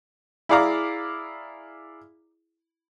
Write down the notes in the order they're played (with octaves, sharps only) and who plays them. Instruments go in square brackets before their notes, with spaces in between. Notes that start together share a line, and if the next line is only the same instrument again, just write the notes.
[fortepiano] E4 G#4 D5 F5 A#5 D6